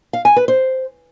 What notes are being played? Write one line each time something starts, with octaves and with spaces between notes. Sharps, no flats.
F5
G#5
B4
C5